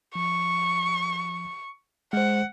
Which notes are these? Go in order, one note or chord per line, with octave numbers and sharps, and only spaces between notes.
F3 C#6
G#3 C5 F#5